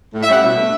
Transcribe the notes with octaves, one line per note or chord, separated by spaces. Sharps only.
A2
E5
G3 C#4 E4 F#5
B2 E5
A3 D4